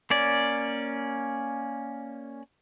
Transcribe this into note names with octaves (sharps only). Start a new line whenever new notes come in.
A#3 C#4 D5